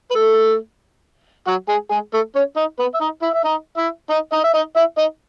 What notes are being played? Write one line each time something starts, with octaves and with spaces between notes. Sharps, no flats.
B4
A3 A4
F#3 F#4
G#3 G#4
G#3 G#4
A3 A4
C#4 C#5
D#4 D#5
B3 B4
E5
D#4 D#5
E4 E5
E5
D#4 D#5
E4 E5
D#4 D#5
D#4 D#5
E5
D#4 D#5
E4 E5
D#4 D#5